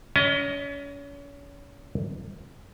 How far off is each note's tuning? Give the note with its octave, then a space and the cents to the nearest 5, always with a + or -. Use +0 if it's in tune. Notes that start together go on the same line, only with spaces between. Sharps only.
C#4 +35 D#5 +5